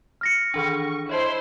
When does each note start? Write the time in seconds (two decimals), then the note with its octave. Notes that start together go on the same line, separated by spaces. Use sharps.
0.21 F6 A#6 C#7
0.54 D#3 E3 D4 C#6
1.09 E4 C5 C#5 D#5 A5 C6